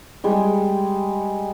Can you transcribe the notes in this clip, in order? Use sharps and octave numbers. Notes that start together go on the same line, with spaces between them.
G3 G#3